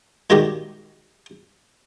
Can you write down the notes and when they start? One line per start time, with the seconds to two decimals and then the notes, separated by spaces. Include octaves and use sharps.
0.30 A#2 D#3 G#3 F#4 G4